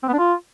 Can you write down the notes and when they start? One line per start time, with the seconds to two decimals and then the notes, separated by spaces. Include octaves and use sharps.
0.03 C4
0.08 B3
0.13 D4
0.18 F4